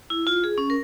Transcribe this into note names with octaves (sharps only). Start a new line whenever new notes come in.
E4
F4
G#4
C#4
A#4